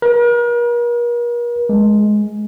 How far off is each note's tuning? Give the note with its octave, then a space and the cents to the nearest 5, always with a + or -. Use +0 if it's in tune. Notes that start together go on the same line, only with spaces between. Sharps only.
A#4 +45
G#3 +10